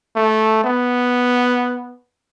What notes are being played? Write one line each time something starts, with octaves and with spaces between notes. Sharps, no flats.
A3
B3